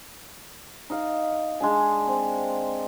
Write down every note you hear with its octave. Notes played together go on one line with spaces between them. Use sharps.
D#4 F5
G#3 D4 G#5
C4